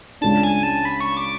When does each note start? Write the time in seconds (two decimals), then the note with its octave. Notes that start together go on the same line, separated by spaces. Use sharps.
0.21 C#2 C#3 G#3 D4 A5
0.43 G#5
0.63 A5
0.85 B5
1.00 C#6
1.17 D6